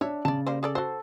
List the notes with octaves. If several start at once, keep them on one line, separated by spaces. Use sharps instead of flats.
D4 C#5 E5
C#3 D5 A5
G3 A#3 C5
G#4 A4 D5
F#4 A4 C5